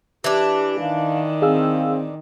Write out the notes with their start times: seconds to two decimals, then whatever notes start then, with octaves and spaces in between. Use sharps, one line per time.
0.24 E3 D4 G4
0.80 D#3 F5
1.42 C4 G#4 F5 E6